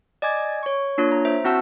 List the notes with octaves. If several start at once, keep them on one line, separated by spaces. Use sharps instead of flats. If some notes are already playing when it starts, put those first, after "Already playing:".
D5 D#5 G#5 D6 G#6 A6
C#5 C#6
A#3 D4 F4 C#5
A#5
C5 E5
C4 E4 F#4 F#5 A5 E6